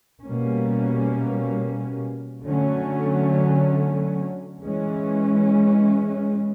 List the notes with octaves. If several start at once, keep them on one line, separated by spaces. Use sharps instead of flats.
B2 G3 A#3 C#4
D3 F#3 A3 C#4
E3 G#3 C#4